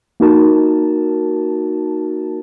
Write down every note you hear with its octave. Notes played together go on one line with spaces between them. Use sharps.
A#3 D#4 F#4 A#4 A5